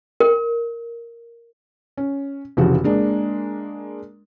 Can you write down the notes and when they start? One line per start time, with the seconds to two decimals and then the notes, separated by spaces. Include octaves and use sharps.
0.20 A#4
1.97 C#4
2.57 F1 C#3 E3 F3 F#4
2.84 G#3 A#3 D4